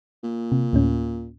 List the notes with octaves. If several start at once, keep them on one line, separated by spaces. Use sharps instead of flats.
A#2
C3
D2 A2 C#4